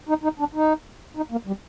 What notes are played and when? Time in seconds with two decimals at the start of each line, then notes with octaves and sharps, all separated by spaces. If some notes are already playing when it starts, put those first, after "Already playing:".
0.09 D#4
0.23 D#4
0.39 D4
0.55 D#4
1.17 D#4
1.32 A#3
1.47 G3